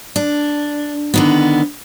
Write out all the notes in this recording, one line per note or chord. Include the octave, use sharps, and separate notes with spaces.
D4
D3 D#3 B3